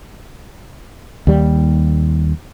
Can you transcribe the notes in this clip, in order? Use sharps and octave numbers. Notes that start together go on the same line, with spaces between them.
D#2 G3